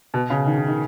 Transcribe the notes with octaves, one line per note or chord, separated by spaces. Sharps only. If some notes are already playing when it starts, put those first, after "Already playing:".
B2
C#3
D#3
D#3
D#3